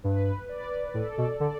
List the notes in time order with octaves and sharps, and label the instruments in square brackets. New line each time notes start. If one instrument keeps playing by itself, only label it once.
[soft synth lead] G2 [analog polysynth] B4
[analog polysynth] D5
[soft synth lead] A2 [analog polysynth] A4
[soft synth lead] B2
[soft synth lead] D3 [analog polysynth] D5